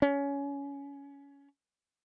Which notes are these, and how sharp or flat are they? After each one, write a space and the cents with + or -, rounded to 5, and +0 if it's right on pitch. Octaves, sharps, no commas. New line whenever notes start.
C#4 +20